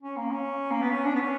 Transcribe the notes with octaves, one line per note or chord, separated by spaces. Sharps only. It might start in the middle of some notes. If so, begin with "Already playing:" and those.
C#4
A#3
C#4
A#3
B3
C#4
D4
B3
C#4